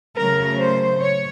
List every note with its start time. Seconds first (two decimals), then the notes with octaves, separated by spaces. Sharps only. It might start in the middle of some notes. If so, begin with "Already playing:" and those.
0.17 C#3 F#3 A3 A#4
0.60 C5
1.01 C#5